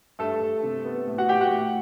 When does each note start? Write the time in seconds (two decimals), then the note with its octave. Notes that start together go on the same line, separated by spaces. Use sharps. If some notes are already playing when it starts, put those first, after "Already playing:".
0.19 G2 A3 A4
0.41 G2
0.63 C3
0.85 B3
1.07 A2
1.18 F#4 F#5
1.29 A2 G4 G5
1.41 F#4 F#5
1.51 A2